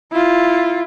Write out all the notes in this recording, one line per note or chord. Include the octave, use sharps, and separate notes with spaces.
E4 F4